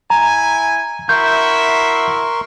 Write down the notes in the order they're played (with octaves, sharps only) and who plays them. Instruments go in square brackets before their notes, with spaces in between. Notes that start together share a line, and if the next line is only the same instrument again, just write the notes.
[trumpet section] E4 G#5 [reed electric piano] A#5
[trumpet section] E4 F#4 E5 [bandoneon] A#4 C6 C#6 [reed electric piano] G6